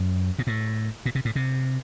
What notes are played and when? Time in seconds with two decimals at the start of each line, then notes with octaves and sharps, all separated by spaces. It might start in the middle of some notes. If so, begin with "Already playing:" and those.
Already playing: F#2
0.39 A#2
0.47 A2
1.06 A#2
1.15 C3
1.25 A2
1.36 C3